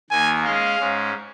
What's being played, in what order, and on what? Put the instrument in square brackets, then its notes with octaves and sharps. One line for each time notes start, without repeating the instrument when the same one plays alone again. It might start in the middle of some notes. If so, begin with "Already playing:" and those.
[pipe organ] D#2 D#3 A#3 [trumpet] G#5
[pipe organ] G#3 C#4 G#4 D#5 [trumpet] F5
[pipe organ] G#2 G#3 C#4